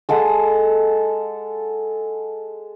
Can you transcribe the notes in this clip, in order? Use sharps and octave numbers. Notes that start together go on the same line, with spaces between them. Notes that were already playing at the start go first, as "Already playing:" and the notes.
G#3 A4 F#5 A5